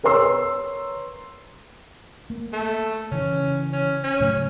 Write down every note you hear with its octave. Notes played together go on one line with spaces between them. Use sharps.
A#4 B4 C#5 C6 E6
A#3
A3
C#3 E3 C#4
C#4
C#4
A2 C#3 F#3